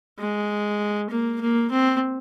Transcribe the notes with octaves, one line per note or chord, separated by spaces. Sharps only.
G#3
A#3
A#3
C4